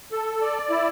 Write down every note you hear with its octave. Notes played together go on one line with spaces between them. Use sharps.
A4
D5
E4